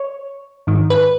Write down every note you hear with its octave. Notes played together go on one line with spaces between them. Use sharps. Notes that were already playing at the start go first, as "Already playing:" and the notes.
Already playing: C#5
G#2 D#3
B4